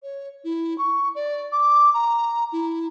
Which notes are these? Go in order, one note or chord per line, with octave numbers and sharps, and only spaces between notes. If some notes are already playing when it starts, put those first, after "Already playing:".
C#5
E4
C#6
D5
D6
A#5
E4